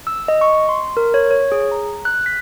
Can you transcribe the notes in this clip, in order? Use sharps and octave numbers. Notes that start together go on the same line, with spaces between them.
E6
D#5
C#6
C6
A#4
C#5
C#5
G#4
A#5
F#6
B6